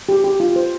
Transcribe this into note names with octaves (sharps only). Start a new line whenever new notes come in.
G4
G4
F4
C5